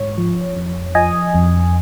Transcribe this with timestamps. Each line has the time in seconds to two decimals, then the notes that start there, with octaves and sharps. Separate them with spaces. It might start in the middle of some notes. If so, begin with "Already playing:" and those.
Already playing: G#2 C#5
0.18 F3
0.57 F2
0.95 F3 D#5 G#5
1.35 F2